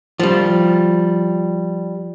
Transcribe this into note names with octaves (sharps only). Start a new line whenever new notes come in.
F3 G3